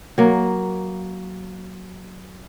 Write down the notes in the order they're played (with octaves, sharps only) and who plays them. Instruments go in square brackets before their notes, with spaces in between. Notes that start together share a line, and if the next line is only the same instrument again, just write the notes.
[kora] F#3 A#3